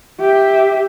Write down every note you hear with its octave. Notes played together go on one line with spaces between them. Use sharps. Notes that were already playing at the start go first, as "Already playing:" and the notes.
G4 E5